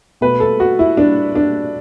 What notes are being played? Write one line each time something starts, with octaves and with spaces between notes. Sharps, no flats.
B2 A3 B4
A4
F#4
E4
D4
D4